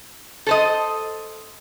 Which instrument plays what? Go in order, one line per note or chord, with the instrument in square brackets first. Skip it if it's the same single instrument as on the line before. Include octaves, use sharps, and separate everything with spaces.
[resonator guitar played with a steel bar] A4 C5 D#5